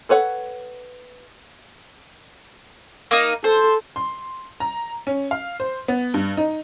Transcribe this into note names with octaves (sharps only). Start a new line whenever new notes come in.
A4 B4 C#5 F#5
A#3 D#4
A4 C5
C6
A#5
C#4
F5
C5
B3
G2
D#4